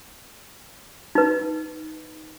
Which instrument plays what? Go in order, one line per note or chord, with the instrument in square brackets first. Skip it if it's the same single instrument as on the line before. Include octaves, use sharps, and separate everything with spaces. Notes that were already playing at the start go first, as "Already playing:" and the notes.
[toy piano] D#4 B4